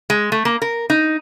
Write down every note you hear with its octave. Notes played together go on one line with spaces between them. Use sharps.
G#3
A3
A#3
A#4
D#4